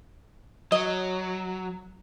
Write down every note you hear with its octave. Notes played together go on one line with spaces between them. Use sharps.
F#3 D#5